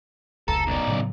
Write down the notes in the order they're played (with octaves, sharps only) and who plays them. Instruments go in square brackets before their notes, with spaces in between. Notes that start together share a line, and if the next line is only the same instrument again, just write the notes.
[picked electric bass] F1 C#2 [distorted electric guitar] A4 [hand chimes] A#5
[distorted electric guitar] B1 D5
[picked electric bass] A2 C#3 F#3